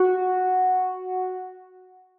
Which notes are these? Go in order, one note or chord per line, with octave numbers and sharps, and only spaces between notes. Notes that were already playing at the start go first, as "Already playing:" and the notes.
Already playing: F#4